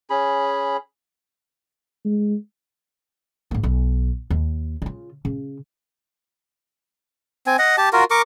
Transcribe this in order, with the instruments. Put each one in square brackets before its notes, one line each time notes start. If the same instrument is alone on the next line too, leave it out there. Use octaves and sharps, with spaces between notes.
[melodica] C#4 G#4 B5
[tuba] G#3
[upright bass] G#2 A#3
B1
D#2
C#3 F4
C#3
[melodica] C4 G#5
D#5 F#5
G4 A5
F4 F#4 A#4
A#4 C#6 D6